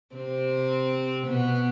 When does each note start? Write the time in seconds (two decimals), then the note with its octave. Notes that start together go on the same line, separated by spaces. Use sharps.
0.15 C3 C4
1.27 B2 B3